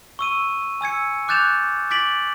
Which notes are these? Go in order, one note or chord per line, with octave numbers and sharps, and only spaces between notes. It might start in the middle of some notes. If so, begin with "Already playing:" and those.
C#6 E6 D#7
G#5 E6 G#6 C#7
D6 F#6 G6 A6 E7 F7
D6 A6 B6 D7 F#7